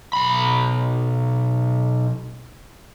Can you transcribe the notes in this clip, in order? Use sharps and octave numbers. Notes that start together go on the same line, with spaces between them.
B1 B5